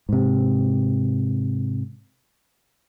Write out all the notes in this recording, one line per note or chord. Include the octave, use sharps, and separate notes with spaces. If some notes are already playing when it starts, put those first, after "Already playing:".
G#2 C3